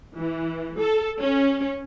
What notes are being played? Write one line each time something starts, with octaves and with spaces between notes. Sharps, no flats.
E3
A4
C#4